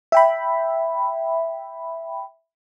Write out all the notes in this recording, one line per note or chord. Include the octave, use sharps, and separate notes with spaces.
E5 G5 B5